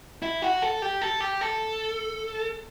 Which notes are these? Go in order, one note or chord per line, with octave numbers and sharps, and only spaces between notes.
E4
F#4
A4
G4
A4
G4
A4